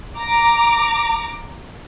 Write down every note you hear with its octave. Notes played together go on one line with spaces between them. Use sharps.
A#5 D6